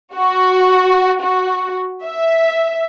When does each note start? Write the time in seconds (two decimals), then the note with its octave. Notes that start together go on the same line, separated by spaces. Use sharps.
0.14 F#4
1.20 F#4
2.04 E5